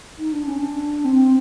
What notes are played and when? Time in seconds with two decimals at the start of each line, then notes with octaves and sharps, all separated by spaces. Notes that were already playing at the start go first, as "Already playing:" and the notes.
0.19 D#4
0.32 D4
0.46 C#4
0.59 D4
1.05 C4